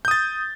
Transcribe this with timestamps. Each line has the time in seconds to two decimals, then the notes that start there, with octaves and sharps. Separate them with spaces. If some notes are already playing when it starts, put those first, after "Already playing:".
0.05 G6
0.08 D#6
0.11 A6